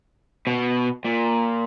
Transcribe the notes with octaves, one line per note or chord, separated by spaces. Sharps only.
B2
A#2